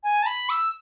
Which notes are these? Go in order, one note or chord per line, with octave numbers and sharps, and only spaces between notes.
G#5
A5
B5
E6